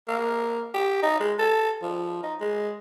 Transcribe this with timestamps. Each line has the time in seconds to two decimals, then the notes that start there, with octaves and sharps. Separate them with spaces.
0.08 A#3
0.74 G4
1.03 D#4
1.20 G#3
1.39 A4
1.83 F3
2.23 D#4
2.41 G#3